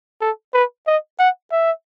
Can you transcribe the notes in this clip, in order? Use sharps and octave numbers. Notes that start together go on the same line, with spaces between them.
A4
B4
D#5
F#5
E5